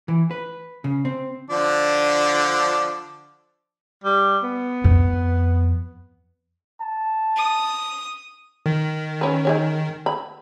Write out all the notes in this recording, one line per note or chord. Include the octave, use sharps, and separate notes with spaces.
E3
B4
C#3
C4
D3 F3 D4
G3
B3
F2
A5
D#6
D#3
C#4 B4
D#4 G#4 C#5
B5